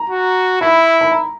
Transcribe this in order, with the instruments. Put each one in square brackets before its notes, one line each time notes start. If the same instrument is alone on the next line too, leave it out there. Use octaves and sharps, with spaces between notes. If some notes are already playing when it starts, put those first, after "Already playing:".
Already playing: [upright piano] A#5
[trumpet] F#4
[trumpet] E4 [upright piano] B5
[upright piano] B5
A#5